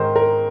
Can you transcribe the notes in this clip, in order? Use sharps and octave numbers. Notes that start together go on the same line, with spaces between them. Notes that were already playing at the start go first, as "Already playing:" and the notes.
Already playing: G#2 D#3 A#4 C5
A#4